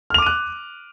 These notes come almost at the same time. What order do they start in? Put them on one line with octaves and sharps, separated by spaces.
F6 F7 D6 D#7 F#6